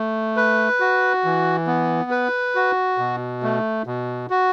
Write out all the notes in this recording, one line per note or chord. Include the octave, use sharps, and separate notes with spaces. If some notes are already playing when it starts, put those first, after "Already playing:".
Already playing: A3
B4
F#4
E3
B3
B4
F#4
B2
A3
B2
F#4